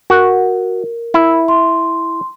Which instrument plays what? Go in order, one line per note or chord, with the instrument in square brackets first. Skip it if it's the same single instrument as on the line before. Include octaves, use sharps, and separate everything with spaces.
[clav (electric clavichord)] F#4 [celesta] A#4
[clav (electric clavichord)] E4
[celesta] C6